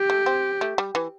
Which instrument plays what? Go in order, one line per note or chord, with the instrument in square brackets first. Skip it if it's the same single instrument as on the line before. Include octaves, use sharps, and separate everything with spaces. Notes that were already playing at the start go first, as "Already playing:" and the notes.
Already playing: [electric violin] G4
[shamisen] A3
C4
A3
G3
E3